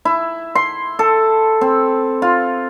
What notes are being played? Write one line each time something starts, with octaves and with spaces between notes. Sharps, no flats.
E4
C6
A4
C4
F4